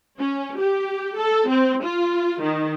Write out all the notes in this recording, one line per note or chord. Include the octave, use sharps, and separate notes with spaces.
C#4
G4
A4
C4
F4
D#3